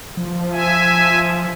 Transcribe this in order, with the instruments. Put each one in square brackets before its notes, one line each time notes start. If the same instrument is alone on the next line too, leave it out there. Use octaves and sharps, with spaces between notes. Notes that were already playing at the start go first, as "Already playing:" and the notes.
[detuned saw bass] F3
[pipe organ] E5 G#5